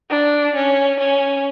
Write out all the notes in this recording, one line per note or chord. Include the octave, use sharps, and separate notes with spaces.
D4
C#4
C#4